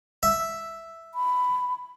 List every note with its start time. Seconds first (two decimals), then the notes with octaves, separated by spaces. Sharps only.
0.23 E5
1.14 B5